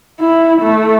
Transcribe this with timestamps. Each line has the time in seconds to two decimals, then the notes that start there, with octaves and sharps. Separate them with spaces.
0.20 E4
0.61 A3